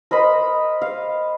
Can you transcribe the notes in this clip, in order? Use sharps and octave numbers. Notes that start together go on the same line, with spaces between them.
A#4 C5 D#5 B5
F5